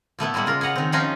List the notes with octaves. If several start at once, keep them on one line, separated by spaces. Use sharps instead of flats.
A#2 A3 B3 E4
G3 G#3 A#3 E4 F#5
C#3 F4 A#4
G#4 B4 F#5 A#5
D#3 C4
F3 C#4 D#4 F4 G#4 D#5